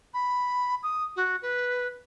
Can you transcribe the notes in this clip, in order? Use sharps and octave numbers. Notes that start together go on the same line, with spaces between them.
B5
D#6
F#4
B4